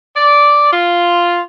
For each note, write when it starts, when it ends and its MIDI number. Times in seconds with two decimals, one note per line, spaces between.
0.16 0.71 74
0.73 1.40 65